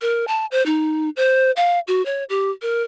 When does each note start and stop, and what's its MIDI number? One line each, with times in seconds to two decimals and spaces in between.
0.02 0.25 70
0.28 0.46 81
0.51 0.64 72
0.66 1.10 63
1.16 1.51 72
1.56 1.80 77
1.88 2.04 66
2.06 2.24 73
2.29 2.51 67
2.62 2.83 70